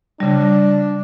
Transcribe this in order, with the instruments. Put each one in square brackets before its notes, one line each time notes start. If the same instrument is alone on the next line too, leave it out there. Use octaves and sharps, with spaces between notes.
[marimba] C#3 G3 [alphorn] D4